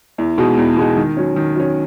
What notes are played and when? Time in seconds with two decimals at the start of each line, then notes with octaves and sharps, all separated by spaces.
0.18 E2
0.38 B2 G#3 D#4 F#4
0.58 E2
0.77 B2 G#3 D#4 F#4
0.97 D#3
1.17 F#3 C#4
1.36 D#3
1.56 F#3 C#4